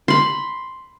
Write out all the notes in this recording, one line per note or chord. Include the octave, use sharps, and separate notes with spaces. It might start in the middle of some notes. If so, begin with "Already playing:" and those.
B5 C6